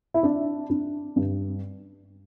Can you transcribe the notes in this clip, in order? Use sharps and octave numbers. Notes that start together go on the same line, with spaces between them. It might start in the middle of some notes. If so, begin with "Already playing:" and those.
E4
D4
D4
G2